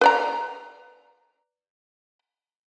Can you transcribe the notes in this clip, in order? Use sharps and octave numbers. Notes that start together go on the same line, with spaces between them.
B4 D5 A#5